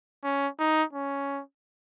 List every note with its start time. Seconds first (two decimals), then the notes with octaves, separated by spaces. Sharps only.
0.24 C#4
0.59 D#4
0.93 C#4